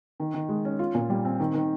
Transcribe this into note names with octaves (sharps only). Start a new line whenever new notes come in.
D#3
D#3
G#3
C#4
F4
A#2
G3
C4
D#3
D#3